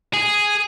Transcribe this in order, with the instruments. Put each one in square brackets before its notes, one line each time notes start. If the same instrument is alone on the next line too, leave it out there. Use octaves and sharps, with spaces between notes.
[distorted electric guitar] G#4